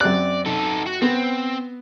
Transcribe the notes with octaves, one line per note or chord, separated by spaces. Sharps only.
F#2 C4 D5 F#6
D#4 A4
F#4
B3 C4